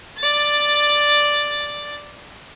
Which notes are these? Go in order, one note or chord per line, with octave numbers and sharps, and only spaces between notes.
D5 A6